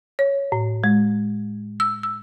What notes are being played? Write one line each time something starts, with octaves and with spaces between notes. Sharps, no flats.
C#5
A2
G#3
E6
E6